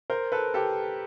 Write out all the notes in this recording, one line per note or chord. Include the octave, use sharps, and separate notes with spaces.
A#4 C5
A4 B4
G4 A4